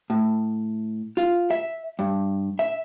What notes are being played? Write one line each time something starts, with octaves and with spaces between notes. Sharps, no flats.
A2
F4
E5
G2
E5